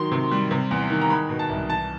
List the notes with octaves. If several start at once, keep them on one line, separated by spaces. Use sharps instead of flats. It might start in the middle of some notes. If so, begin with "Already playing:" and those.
Already playing: D#3 F#3 C6
C3
G3
C3
E2
D#3
A#5
G#3 B5
B2
A5
C2
E3 A5